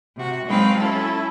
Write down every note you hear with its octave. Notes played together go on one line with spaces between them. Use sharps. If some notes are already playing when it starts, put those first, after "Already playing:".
C3 F#4
F#3 G#3 C4 D#4 B4 F5
C#4 E4 A4